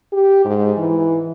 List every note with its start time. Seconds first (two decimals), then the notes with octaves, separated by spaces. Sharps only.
0.13 G4
0.45 G#2
0.77 E3